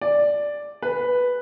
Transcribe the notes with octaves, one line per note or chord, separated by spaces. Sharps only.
D5
B4